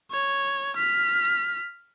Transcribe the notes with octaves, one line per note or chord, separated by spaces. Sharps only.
C#5
F6 B6